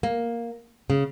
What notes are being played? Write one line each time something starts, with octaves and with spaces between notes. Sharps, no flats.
A#3
C#3